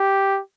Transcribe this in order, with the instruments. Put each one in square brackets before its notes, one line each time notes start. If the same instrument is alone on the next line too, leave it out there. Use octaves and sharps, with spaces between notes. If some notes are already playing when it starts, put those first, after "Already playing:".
Already playing: [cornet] G4